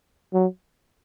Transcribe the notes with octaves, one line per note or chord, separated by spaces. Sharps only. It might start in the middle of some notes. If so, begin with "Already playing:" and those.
F#3